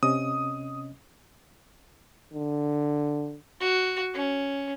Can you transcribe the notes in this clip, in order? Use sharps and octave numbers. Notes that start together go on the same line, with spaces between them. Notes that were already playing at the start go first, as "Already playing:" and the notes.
C3 C#4 D#5 D#6
D3
F#4
C#4